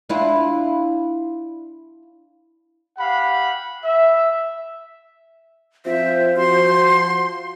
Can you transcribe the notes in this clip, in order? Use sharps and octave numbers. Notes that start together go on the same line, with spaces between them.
D4 E4 F4
G4 F5 F#5 B5
E5
F3 C4 F4 C5 E5
F3 F#4 C6